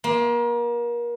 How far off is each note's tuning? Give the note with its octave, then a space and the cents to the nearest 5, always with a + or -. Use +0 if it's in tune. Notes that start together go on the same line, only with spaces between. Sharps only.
A#3 +35 C6 +0